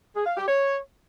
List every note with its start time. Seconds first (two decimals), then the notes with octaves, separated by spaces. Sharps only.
0.15 G#4
0.26 F5
0.37 G4
0.47 C#5